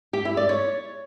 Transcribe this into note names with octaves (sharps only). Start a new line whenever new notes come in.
G4
E4
D5
C#5